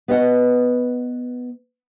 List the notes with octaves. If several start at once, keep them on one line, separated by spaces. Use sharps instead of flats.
B3 B4 D#5 F5 F#5